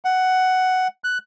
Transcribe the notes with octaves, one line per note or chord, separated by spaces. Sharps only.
F#5
F#6